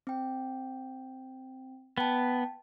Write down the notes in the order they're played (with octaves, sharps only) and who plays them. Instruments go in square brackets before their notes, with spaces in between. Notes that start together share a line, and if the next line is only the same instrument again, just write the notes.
[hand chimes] C4 G5
[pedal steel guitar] B3 [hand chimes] G5 A5